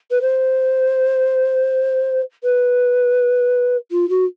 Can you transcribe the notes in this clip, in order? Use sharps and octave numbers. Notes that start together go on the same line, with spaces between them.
B4
C5
B4
F4
F#4